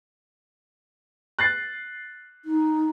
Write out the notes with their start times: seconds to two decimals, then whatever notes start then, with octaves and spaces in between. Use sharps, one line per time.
1.39 F#6 A6 C7
2.45 D#4